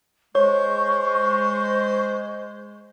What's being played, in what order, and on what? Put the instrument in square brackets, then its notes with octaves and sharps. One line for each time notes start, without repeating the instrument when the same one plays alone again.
[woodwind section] G#3 [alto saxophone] C5 [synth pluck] C#5 [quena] C#6